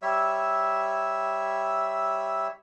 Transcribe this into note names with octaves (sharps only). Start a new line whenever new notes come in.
G3 C#5 E5 E6